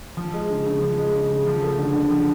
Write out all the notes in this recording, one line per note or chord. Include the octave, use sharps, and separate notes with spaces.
F3
G#3
C#3
C#3
F3
G#3
C#3
C#3
F3
A3
D3
D3
F3